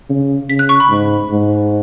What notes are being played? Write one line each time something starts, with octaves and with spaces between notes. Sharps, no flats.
C#3
C#3 B6
F#6
C#6
B5
G#2
G#2